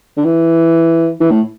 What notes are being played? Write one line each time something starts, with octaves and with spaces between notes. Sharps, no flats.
D3
E3
E3
A2